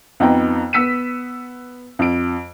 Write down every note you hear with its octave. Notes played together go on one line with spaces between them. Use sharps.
F2 B3 D#4 G5 A#5
B3 E6 B6 C#7 D#7
F2 D7